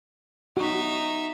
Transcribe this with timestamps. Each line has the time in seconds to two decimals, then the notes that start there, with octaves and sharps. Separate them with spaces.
0.57 D#4 F#4 E5